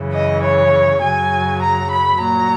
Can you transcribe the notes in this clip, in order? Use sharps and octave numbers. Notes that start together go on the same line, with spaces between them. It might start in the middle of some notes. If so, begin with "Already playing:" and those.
Already playing: F#2 C#3 E3
D#5
C#5
F#2 C#3 F#3 G#5
A#5
B5
A#2 F#3 A#5